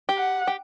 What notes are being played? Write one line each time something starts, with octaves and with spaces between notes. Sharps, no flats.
G4
F#5
G4